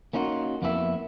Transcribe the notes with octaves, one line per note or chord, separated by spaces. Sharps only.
A#3 C#4 D#4 F4 F#4
F2 A#3 B3 E4 G4 E5